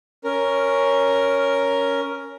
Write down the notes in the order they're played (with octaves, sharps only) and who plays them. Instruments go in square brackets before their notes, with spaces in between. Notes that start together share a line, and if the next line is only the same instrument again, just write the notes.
[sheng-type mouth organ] C#4 A#4